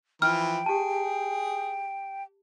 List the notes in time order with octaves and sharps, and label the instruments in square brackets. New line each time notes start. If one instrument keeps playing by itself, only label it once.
[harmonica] E3 F3 E4 [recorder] G5 [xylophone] F6
[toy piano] G4 A5 [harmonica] G#4